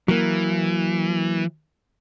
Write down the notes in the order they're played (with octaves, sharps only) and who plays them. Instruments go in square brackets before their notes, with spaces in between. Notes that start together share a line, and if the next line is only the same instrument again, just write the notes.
[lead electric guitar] E3 [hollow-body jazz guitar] F#3 A#3